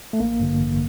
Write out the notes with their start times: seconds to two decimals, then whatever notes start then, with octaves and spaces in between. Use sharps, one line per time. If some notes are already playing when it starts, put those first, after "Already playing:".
0.13 A3
0.20 A1 A#3
0.40 G2 D3
0.59 A1